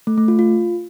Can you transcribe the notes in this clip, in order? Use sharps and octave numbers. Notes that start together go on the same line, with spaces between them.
A3
A3
F4
F4